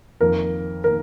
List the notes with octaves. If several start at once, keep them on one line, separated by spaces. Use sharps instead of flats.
F2 D#3 A#3 A#4
D#3 A#3 A#4